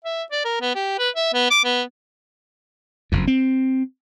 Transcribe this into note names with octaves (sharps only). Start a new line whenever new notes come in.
E5
D5
A#4
B3
G4
B4
E5
B3
D6
B3
F#1 F2
C4